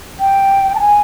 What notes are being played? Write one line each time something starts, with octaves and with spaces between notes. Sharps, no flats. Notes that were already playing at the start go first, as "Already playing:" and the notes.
G5
A5
G#5